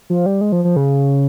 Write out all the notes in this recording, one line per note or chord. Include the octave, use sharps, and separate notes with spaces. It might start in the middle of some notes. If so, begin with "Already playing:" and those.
F3
G3
G#3
F3
F3
C#3